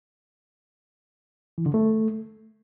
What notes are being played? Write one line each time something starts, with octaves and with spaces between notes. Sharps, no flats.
E3
D3
A3